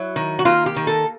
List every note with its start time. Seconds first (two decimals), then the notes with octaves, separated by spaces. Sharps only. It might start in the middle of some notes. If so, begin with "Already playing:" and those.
Already playing: F#3 E4
0.16 D#3
0.39 F#4
0.45 A#3 F4
0.66 G4
0.76 D#3
0.87 A4